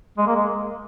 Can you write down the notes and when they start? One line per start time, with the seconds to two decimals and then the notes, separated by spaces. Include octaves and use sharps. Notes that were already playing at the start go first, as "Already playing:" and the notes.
0.18 G#3
0.27 A#3
0.36 G#3